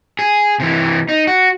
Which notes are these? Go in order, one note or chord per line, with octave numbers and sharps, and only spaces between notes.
G#4
C3 E3
D#4
F#4